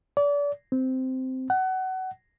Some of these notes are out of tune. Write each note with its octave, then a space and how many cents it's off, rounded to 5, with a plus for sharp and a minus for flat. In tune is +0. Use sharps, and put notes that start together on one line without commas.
D5 -35
C4 -10
F#5 +25